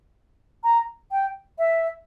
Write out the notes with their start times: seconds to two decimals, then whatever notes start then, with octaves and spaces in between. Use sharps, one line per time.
0.64 A#5
1.11 G5
1.58 E5